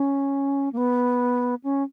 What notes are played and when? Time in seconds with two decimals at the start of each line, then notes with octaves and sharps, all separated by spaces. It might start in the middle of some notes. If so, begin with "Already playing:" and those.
Already playing: C#4
0.73 A#3
0.77 B3
1.64 C#4